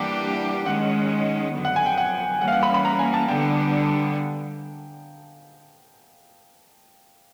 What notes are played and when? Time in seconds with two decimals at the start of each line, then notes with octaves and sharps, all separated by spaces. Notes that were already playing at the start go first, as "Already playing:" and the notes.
Already playing: E3 G3 A#3 D4 G4 F#5
0.66 D#3 G#3 C#4 F#5
1.53 F2 D3 F#3 B3
1.65 F#5
1.76 G#5
1.86 G5
1.98 F#5
2.40 E3 G3 A#3 C#4 F#5
2.48 F5
2.52 F#5
2.63 B5
2.74 B5
2.85 A#5
2.99 G#5
3.14 A5
3.28 D3 G3 B3 D4 G5